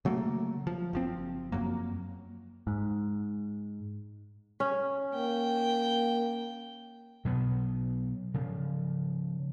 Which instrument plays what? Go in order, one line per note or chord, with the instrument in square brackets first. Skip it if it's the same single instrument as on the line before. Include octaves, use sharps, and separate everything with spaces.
[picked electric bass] C#3 F#3 A3 A#3
F3
F#1 F3 C4
F#2 F#3 A#3
G#2
[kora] C#4
[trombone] A#3 [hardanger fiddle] G5
[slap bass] B2 F#3 B3
C#3 F3